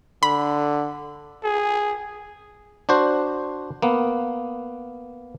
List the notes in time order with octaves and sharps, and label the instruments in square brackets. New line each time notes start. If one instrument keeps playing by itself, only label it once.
[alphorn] D3 [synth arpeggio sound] B5
[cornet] G#4
[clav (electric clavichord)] D4 F#4 C5
A#3 B3